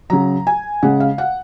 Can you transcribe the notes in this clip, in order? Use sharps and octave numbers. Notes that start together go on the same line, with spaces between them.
C#3 F#3 A#5
G#5
C#3 G#3 F#5
F5
F#5